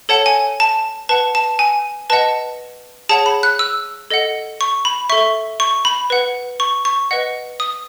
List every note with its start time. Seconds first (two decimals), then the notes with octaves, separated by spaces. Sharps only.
0.09 A4 C#5 F#5 A5
0.26 G#5
0.60 A5
1.09 B4 F#5 A5
1.35 A5
1.59 G#5
2.10 B4 D#5 F#5 A5
3.09 G#4 C#5 F#5 A5
3.26 B5
3.43 F#6
3.59 E6
4.11 A4 D#5 F#5
4.61 C#6
4.85 B5
5.10 A4 E5 C#6
5.60 C#6
5.85 B5
6.10 B4 F#5
6.60 C#6
6.85 C#6
7.11 B4 D#5 F#5
7.60 D#6